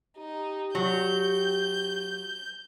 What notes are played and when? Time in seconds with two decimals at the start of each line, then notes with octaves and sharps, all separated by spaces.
0.18 D#4 G4
0.75 F#3 G6